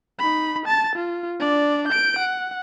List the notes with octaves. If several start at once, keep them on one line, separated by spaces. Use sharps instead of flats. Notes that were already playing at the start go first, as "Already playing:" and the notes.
D#4 B5
A5 A6
F4
D4 D5
G6 D7
F#5